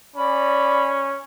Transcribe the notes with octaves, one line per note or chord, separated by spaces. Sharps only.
C#4 D5 B5